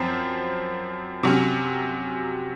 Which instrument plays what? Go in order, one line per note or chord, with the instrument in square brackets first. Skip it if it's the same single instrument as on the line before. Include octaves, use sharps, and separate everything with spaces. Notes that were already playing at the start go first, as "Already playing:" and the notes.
Already playing: [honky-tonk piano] F#2 F3 C4
C3 F#3 C#4